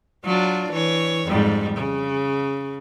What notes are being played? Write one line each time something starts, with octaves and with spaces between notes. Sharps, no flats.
F#3 D4 F4
E3 C#5
F2 G#2 G3
C#3